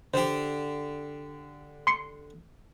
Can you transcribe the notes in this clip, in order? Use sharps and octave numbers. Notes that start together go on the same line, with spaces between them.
D3 G4 C5
C6 C7 C#7